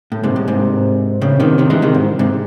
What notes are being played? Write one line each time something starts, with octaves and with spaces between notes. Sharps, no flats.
A2
G#2 C3
A2
G#2 C3
A2 C#3
C3 D#3
C3 D#3
E3 G#3
C3 D#3
G#2
G#2 C3